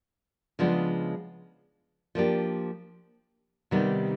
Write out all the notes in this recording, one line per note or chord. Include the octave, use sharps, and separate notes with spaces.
C#3 F3 G#3 B3 D4
F3 A#3 D4 G4
C3 D#3 G3 B3 D#4